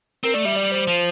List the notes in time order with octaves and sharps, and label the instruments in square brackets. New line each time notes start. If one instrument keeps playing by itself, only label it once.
[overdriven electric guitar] C4 [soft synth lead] A#4
[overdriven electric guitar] A3 [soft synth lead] D5
[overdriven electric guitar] G3 [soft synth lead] E5
[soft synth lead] D5
C5
[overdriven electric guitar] F3